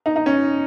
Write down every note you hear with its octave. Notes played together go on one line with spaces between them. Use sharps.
D#4
D#4
C#4